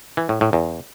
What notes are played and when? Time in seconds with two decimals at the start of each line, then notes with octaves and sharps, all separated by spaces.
0.17 E3
0.29 A2
0.41 A2
0.53 E2